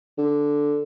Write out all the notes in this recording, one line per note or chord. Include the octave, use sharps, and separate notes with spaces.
D3